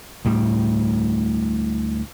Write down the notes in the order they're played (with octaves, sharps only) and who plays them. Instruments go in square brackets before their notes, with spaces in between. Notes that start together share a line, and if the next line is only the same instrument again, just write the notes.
[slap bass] D2 A2 G3